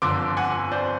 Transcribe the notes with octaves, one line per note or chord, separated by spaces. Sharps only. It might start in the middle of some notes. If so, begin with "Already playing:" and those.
G1 F2 D3 C6 D6
F#5 G#5
C5 D5